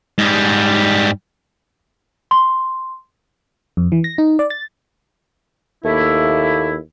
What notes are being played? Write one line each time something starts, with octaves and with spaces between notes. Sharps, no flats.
G#2 G3
C6
F2
E3
A#6
D#4
D5
A6
D#2 A3 A#3 E4